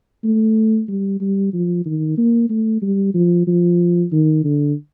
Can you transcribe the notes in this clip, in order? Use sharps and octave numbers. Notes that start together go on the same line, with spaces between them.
A3
G3
G3
F3
D#3
A#3
A3
G3
F3
F3
D#3
D3